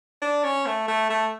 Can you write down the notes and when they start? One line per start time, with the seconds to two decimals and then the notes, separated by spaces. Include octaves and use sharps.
0.22 D4
0.44 C#4
0.66 A3
0.88 A3
1.10 A3